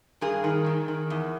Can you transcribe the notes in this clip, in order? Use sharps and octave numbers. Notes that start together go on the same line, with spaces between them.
G2 G#4 A#4
D#3
D#3
D#3
E2